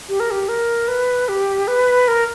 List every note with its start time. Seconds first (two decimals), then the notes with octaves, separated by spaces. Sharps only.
0.09 G4
0.20 A#4
0.31 G4
0.49 A#4
0.88 B4
1.29 G4
1.68 B4
2.08 A#4